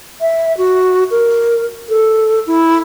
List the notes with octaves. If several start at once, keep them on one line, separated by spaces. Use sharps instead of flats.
E5
F#4
A#4
A4
E4